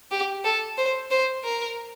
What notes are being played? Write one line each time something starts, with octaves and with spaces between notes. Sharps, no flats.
G4
A4
C5
C5
A#4